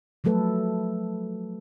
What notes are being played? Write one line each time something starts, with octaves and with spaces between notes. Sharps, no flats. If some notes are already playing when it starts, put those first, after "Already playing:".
F3 F#3 A3 A4 B4